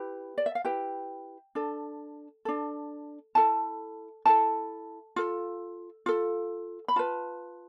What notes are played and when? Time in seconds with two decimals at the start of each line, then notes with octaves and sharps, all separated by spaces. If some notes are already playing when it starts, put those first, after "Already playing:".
Already playing: E4 G4 B4
0.38 D5
0.46 E5
0.55 F5
0.65 E4 G4 B4 G5
1.55 D4 A4
2.45 D4 A4
3.35 E4 A4 A5
4.25 E4 A4 A5
5.16 F4 A4
6.06 F4 A4
6.88 B5
6.96 F4 B4 A5